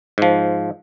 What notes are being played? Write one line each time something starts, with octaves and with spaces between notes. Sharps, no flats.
G#2 F3